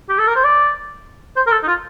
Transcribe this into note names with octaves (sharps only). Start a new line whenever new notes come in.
G4
A4
A#4
C5
D5
C5
A#4
A4
D#4
F4